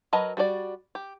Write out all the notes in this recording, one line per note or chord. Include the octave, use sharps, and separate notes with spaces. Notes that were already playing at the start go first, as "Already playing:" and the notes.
F#3 A#4 B4 D#5 A5
G3 F#4 A4 D5
G4